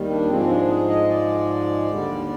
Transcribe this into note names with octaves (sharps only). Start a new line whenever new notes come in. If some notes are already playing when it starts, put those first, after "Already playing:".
Already playing: D#2 D#3 G3
D4
G#2 F3 G#3 C4
D4
G#4
D#5
D5
D#2 D3 G3